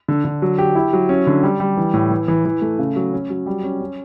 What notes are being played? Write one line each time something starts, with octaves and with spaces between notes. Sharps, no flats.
D3
D3
F#3
G4
E4
F#3
C#4
D3
G3
G3
E3
A2
E3
E3
E3
A3
C#3
F#3
C#4
F#3
G3
C#4
C#4